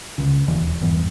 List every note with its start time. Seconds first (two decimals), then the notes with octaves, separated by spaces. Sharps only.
0.18 C#2 C#3
0.48 E1 D#2 E3
0.81 G#1 E2 G2 E3